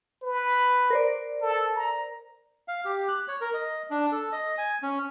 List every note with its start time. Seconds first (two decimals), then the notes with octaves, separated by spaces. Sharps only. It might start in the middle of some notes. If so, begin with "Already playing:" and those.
0.23 B4
0.90 A#4 C5 D5
1.42 A4
1.75 A#5
2.68 F5
2.85 G4
3.08 F#6
3.28 C#5
3.41 A#4
3.54 D#5
3.90 D4
4.12 A4
4.32 D#5
4.58 G#5
4.83 C#4